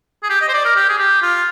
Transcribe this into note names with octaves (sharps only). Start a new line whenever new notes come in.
G#4
G4
D#5
C5
D5
A#4
G4
G#4
G4
F4